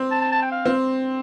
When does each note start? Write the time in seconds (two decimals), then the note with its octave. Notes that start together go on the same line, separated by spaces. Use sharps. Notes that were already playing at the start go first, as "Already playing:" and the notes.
Already playing: C4
0.11 A5
0.21 A5
0.32 A5
0.42 G5
0.52 F5
0.66 C4